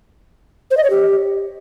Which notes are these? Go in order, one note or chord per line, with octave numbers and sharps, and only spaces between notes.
C5
D#5
C#5
G4